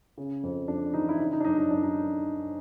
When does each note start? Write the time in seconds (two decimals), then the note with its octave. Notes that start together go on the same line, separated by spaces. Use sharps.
0.18 C#3
0.43 F2
0.68 F2 D4
0.94 E3 D#4
1.09 E4
1.19 C#3 D#4
1.33 D#4
1.40 D4
1.45 F#2 D#4
1.58 D#4
1.70 F#2 D4
1.83 D#4